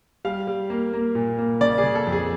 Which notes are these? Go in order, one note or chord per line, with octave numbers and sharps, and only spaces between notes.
G3 F5
G3
A#3
A#3
A#2
A#3
C#3 D5
G#4
C#3
A4
F2
G#4